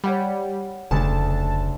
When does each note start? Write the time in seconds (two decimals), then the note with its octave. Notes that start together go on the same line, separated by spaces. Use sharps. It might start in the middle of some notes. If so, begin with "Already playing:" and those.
0.04 G3 C#5 F#5 B5
0.91 F1 D2 C#3 A5